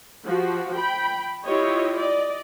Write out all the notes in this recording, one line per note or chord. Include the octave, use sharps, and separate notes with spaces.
F3 F#4 G4
G5 B5
E4 F4 G4 C#5 D#5
D5 D#5